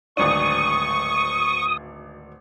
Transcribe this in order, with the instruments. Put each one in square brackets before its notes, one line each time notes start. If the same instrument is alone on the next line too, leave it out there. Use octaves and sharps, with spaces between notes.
[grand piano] D1 G#1 D4 [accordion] C#6 [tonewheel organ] D#6